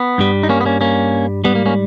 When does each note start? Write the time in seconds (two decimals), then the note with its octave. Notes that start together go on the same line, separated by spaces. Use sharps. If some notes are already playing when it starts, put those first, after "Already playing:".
Already playing: B3
0.18 G2 G3
0.43 D#4
0.49 A#3 C#4
0.61 B3
0.65 A#3 C#4
0.81 A#3 C#4
1.44 G3 B3
1.48 G#2
1.55 A#3
1.66 A#3 C#4